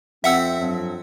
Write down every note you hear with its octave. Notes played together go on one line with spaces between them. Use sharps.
F2 C4 E5 F#5 E6
G2 F3 F#3